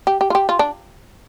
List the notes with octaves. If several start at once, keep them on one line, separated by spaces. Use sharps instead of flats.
G4
G4
F4
G4
F4
D4